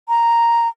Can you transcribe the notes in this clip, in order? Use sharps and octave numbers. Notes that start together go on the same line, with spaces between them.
A#5